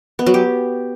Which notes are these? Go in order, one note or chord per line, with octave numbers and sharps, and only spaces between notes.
B3
F#3
G4